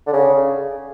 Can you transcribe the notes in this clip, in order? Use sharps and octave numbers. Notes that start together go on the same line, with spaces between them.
D3
C#3